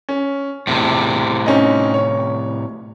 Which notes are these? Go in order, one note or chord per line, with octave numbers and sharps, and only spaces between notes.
C#4
E1 A2 C3
C4 C#4 D#4
C#5